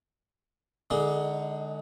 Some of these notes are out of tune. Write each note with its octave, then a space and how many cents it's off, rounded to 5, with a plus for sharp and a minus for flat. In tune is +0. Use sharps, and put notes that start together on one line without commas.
D3 +20 G#3 +0 D#4 +30